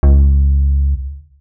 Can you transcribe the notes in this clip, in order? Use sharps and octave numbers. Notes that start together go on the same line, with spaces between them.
C#2